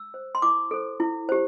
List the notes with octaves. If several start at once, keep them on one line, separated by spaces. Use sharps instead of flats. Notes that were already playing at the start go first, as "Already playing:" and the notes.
Already playing: E6
C5
C6
E4 D6
A4 C5
E4
G4 C5